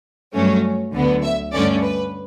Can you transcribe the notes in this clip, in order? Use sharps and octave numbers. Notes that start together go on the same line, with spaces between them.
G2 F#3 A3 C#4
D2 D3 F#3 B3
E5
G2 D3 A3 C#4 D5
B4